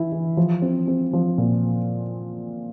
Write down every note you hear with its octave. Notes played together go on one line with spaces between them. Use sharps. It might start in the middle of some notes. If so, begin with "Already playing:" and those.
Already playing: E3 E4
E3
F3
C4
C4
F3
A#2